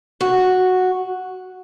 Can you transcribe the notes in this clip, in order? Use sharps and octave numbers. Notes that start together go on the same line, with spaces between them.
F#4